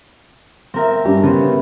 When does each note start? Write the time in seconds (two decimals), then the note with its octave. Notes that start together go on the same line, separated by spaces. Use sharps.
0.74 C4 A#4 E5
1.05 G2 C#4 D4 G4
1.23 C#3 B3 C4